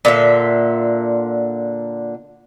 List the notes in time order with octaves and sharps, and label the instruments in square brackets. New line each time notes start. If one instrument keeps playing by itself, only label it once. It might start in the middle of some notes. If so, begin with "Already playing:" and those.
[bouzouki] A#2 D3 E5